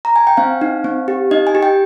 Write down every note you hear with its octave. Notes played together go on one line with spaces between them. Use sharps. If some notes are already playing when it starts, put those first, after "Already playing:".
A#5
G#5
G5
C4 F5
D#4
C4
G4
D#4 D#5
G#5
G4
G5